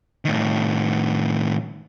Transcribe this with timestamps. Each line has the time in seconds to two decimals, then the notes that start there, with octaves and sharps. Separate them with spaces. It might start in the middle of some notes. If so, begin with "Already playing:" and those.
0.25 A2 D#3